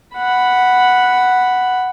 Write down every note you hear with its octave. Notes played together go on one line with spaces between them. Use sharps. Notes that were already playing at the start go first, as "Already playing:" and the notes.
F#5 B5